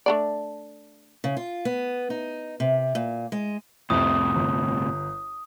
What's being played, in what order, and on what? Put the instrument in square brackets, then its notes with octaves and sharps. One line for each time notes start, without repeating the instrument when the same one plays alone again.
[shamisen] A3 D4 D5
[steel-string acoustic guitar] C#3
F4
B3
D#4
C3
A#2
G#3
[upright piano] C2 F2 [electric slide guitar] A2 C3 [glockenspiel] D#6
[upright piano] G1